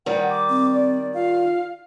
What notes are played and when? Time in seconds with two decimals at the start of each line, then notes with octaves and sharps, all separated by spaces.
0.06 D#3 G3 F#5
0.30 D6
0.49 C4
0.72 D5
1.14 F4 F5